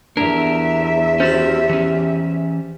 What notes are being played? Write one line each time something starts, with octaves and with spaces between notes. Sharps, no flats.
E2 D4 G4 A#4 E5 A#5
D#2 G3 C#4 F#4 G4 C5 A6
E3 C#4